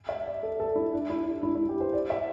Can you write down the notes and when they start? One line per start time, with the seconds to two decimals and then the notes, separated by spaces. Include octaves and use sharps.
0.09 E5
0.26 D5
0.43 A4
0.60 A4
0.76 E4
0.93 D4
1.10 E4
1.26 D4
1.43 E4
1.55 E4
1.69 G4
1.80 C5
1.93 D5
2.10 E5